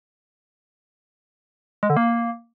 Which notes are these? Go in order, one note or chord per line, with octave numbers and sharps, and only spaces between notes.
G#3
D3
A#3